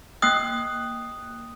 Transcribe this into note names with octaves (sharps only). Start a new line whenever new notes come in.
A#3 G5 D#6 F#6 C7